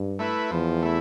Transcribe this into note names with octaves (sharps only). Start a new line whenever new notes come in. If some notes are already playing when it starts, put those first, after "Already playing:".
Already playing: G2
A3 E4 B4
E2 F3
A3 E4